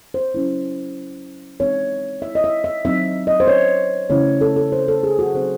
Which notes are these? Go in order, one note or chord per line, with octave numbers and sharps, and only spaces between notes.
C5
F#3 C#4 E4
E3 G#3 C4 D#4 C#5
E5
D#5
E5
E5
F#3 C4 D#4 E5
D#5
C5
C#5
C#3 E3 A3 C#4 E4 C#5
A4
A4
C5
A4
G#4
F#4
C#3 F#3 C4 D#4 C5